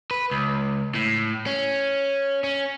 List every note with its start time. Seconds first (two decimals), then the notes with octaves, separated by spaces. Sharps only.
0.11 B4
0.31 C#2
0.95 A2
1.46 C#4
2.44 C#4